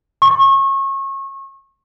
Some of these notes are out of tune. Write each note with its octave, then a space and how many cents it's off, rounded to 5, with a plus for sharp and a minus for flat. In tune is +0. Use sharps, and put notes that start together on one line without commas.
C#6 -30